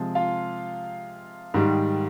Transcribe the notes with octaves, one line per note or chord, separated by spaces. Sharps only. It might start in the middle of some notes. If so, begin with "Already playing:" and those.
Already playing: C3 F3 G#3
F4 F5
G#2 D#3 G3